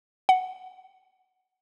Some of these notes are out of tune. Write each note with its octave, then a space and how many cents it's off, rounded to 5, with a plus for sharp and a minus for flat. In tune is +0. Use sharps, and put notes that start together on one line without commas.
F#5 +5